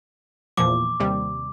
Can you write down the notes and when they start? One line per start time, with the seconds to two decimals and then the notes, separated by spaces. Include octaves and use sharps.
0.57 E2 A#2 F3 D6
1.00 D#2 C3 G3